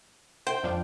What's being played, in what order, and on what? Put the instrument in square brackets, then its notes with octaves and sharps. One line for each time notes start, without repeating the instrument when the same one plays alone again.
[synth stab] C5 [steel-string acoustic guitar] G5
[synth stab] F2 F3 D4